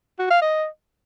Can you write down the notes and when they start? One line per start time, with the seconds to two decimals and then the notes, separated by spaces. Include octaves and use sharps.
0.19 F#4
0.30 F5
0.42 D#5